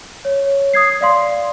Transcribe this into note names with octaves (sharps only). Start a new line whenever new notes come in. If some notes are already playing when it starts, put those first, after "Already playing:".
C#5
D#6 G#6 C7
D5 F5 C6